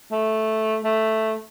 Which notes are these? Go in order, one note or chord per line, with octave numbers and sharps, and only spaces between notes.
A3
A3